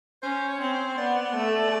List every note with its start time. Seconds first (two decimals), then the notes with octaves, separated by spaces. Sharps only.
0.23 C#4 C5
0.48 C#5
0.61 C4 C#5
0.73 C5
0.98 B3 D5
1.36 A3